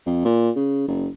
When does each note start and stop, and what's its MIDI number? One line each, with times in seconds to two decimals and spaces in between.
0.06 0.22 41
0.25 0.50 46
0.56 0.88 49
0.88 1.09 30